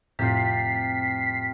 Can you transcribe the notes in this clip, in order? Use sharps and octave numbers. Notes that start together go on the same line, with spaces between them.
F2 A2 C3 F4 B6 C7